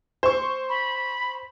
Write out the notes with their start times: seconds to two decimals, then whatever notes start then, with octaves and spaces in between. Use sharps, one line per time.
0.23 C5 C#6
0.69 B5